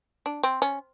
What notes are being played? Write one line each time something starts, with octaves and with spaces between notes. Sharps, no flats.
D4
C4
C#4